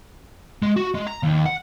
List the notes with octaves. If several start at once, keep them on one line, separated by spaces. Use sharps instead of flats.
G#3
F#4
G#3
A#5
D#2
F#5